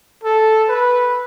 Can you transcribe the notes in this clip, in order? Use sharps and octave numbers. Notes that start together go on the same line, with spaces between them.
A4
B4